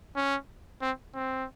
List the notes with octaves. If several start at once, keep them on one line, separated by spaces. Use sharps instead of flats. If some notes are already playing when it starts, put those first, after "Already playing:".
C#4
C4
C4